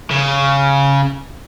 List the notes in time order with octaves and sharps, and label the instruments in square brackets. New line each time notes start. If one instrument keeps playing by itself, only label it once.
[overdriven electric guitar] C#3